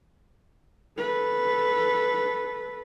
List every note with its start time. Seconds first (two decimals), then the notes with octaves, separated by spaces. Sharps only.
0.98 A4 B4